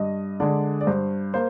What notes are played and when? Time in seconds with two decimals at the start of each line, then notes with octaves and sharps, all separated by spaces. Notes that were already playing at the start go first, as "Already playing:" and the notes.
Already playing: G2 D#5
0.40 D3 G#3 D5
0.81 D5
0.87 G2 C5
1.34 A#3 C5